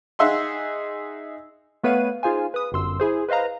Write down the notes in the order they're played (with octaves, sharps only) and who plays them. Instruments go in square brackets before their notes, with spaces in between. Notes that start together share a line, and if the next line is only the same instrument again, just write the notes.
[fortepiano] D#4 G#4 E5 F#5 C6
[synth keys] A3 B3 B4 C#5 F5 D#7
D#4 F4 G#4 C5 F5 G#5
B4 D#6
G1 F#2 C6 E6
E4 G#4 C5
B4 C5 D#5 F5 A#5